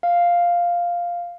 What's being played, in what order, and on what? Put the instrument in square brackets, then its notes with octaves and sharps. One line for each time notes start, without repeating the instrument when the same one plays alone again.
[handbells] F5